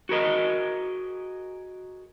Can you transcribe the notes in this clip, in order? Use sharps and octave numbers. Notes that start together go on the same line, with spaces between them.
F#4 G#4 A#4 D#5